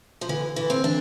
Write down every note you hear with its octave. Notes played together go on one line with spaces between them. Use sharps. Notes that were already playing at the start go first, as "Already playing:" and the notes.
F3
D3 E3
E3
C4
E3 D4